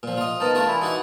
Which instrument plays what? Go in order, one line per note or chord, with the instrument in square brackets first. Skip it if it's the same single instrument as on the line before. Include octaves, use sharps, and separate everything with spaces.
[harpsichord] A#2 F3
F4 D#5
[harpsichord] B3 D#4 [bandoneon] A#4 A5
[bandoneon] A3 A5 [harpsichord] D4 F4 A#4
[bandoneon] E3 E4
[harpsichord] D#4 F#4 F#5